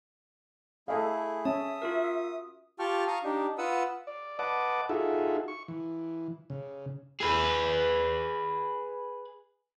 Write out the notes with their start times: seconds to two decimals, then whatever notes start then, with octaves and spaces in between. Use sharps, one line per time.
0.88 A3 E4 G#4 A4 D#5 F5
1.45 C#4 E5 A5 D#6
1.82 F4 F#4 A#4
2.79 F4 G4 G5 A5 C#6 F6
3.07 F5 A#5 C#6 D#6
3.24 D4 D#4 G4
3.58 F4 B4 F#5 D#6 E6
4.07 D5
4.39 B4 D#5 F#5 A5 D6
4.89 D#4 F4 F#4 G#4 A4 E5
5.48 C#6
5.68 E3
6.50 C#3
7.20 G#4 B4